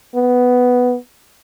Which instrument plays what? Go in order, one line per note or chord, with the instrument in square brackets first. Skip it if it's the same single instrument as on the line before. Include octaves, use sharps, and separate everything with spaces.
[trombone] B3